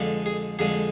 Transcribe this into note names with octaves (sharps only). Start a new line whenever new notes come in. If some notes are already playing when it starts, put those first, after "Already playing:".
Already playing: F2 D3 G#3
G#4
F2 D3 G#3 G#4